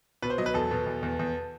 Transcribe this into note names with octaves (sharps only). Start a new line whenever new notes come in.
B2 B4
C5
F#3 D#5
B4
E2 A4
B2
E2
E2
E2